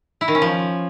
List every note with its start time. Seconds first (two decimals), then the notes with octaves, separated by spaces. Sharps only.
0.21 E4
0.28 D#3
0.35 C#4
0.42 F3